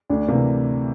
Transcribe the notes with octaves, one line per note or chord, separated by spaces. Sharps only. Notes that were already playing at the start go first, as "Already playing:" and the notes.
D2 D4
C3 E3 A#3